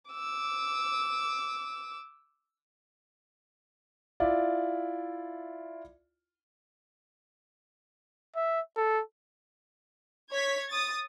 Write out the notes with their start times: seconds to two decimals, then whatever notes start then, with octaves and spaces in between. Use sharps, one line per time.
0.11 D6 E6
4.20 E4 F4 D5
8.36 E5
8.77 A4
10.31 C#5 G#6 B6
10.70 D#6 A6